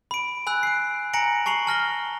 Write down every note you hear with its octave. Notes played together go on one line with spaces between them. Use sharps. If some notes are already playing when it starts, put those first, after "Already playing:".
B5 D7
G#5 B5 E6 F#6
C7 D7
G#5 A#5 A#6 C#7 D7 F#7
A5 C#6 C7 F7 F#7
A5 F6 A#6 G7